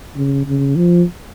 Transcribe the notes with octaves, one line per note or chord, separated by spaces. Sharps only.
C#3
C#3
F3